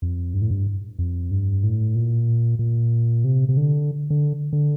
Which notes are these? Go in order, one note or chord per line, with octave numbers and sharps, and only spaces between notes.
F2
G2
A2
G2
F2
G2
A2
A#2
A#2
C3
C3
D3
D3
D3